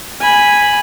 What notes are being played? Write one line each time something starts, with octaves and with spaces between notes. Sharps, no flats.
G#5 B5